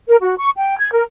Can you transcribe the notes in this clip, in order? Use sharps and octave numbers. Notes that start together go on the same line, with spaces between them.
A#4
F#4
C#6
G5
G#6
A#4